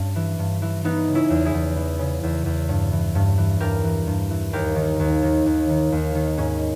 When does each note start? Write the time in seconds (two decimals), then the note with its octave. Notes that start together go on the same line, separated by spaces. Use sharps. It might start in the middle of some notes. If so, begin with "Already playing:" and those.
Already playing: G2 C#4
0.16 E3
0.39 G2
0.62 E3
0.84 E3 B3 D#4
1.07 C#3
1.15 C#4 E4
1.30 E2
1.45 E4 G#4
1.54 E2
1.76 E3
1.99 C#3
2.23 E2
2.46 E2
2.69 G2
2.92 E3
3.15 G2
3.38 E3
3.60 G2 G4 A#4
3.84 E3
4.07 G2
4.30 E3
4.53 D#2 G4 A#4
4.76 D#3
5.00 D#2
5.23 D#3
5.46 D#2
5.69 D#3
5.92 D#2
6.15 D#3
6.37 G#2 C#4